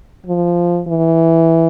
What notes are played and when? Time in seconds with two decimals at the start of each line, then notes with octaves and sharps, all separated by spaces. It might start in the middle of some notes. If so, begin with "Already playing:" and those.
0.26 F3
0.87 E3